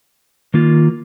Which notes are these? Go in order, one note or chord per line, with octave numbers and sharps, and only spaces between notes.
D#3 A#3 F4